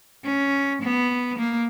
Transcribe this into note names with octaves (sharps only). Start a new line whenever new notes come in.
C#4
B3
A#3